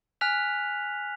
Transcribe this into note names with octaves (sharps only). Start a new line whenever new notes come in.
G#5 F6 F#6 B6 F7